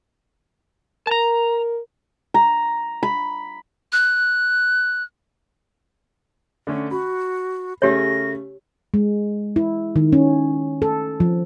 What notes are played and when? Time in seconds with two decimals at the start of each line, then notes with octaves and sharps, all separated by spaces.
1.07 A#4 A5 A#5
2.34 A#5
3.03 B5
3.93 F#6
6.67 D3 A3 C#4
6.91 F#4 B5
7.82 C#3 A3 C#4 G4 C#5 A#6
8.94 G#3
9.56 E4
9.96 D#3
10.13 C#4
10.82 A4
11.20 F3